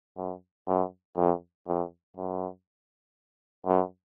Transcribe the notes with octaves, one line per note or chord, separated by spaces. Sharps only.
F#2
F#2
F2
F2
F#2
F#2